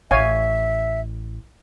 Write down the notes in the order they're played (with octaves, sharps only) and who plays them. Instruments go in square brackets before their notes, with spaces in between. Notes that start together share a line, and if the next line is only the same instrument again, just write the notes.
[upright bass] A1 [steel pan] C#5 F5 G#5 [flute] E5